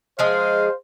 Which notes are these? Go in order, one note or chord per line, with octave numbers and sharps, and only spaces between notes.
F3 G#3 G#4 C5 F5